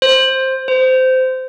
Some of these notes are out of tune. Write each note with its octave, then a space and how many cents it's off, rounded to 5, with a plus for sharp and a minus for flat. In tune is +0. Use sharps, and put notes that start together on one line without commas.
C5 +10
C5 -15